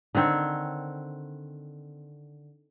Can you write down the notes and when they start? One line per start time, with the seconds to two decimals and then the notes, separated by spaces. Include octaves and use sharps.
0.15 D3 D#3 C4 C#5